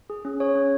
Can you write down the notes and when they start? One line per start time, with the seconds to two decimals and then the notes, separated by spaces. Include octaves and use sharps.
0.10 G#4
0.25 C#4
0.40 G#4 C#5
0.55 C#4